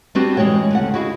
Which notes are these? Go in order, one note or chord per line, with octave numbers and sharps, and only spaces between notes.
G3 B3 C4 D4 F#4 G4
F#2 E3 G#3 G#4 C#5 G5
D2 C#3 F#5
E4 F#4 G#4 D#5 F5